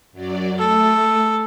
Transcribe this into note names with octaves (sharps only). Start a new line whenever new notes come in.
F#2 F#3 D5
A3 A4